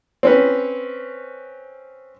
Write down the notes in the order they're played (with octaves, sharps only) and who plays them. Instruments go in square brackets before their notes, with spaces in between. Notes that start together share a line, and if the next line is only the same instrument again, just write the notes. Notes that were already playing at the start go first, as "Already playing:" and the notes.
[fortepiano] C4 C#4 B4